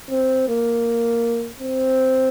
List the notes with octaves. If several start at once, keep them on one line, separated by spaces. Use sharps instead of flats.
C4
A#3
C4